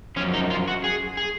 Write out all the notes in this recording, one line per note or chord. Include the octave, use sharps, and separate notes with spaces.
F#2 F3 C#4
D#4
F4
F#4
G#4
G#4